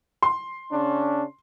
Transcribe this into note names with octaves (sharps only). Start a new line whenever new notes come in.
C6
C#3 C#4 D4